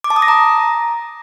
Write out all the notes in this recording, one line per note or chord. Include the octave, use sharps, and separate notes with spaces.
D6
A5
D#6
A#6
A#5